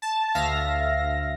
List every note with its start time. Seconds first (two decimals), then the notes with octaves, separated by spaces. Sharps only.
0.02 A5
0.35 D2 E5 F5 A#6